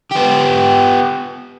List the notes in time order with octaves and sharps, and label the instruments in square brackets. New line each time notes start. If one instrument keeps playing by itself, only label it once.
[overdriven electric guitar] B3 G4